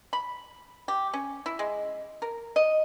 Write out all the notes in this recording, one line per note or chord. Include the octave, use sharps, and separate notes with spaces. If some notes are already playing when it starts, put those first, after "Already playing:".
B5
G4
C#4
E4
G#3
A#4
D#5